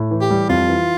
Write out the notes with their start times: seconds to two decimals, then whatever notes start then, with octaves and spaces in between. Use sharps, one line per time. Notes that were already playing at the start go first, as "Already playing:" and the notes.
Already playing: A2
0.11 E3
0.21 G4
0.30 G3
0.49 F2 F4
0.68 E3